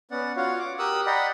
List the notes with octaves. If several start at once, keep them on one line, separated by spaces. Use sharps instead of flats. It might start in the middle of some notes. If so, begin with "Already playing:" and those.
B3 C#4 D5 F#5
F4 F#4 C#5 F5 F#5
D6
G4 A#4 D#6 E6 F#6
D5 D#5 F#5 G5 A#5 B5